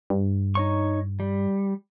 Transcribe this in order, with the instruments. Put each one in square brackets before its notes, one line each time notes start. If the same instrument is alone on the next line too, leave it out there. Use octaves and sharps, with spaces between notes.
[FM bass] G2
[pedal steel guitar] D#4 C#5 C#6
G3